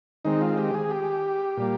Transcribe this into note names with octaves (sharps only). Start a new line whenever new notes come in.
D#3 G#3 C4 D#4
F4
G4
G#4
G4
A#2 G3 A#3